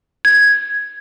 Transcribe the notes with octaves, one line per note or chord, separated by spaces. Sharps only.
G#6